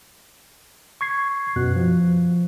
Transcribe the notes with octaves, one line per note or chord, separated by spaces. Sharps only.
C#6 G#6 C7
F#2 B2 F#6
F3